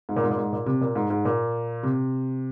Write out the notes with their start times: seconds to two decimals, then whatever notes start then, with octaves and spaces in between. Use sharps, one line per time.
0.09 G#2
0.16 A#2
0.24 G#2
0.31 A#2
0.38 G#2
0.53 A#2
0.66 C3
0.81 A#2
0.95 G#2
1.10 G#2
1.25 A#2
1.83 C3